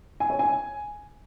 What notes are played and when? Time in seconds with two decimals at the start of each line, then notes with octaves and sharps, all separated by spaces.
0.20 G#5
0.30 C#5
0.39 G#5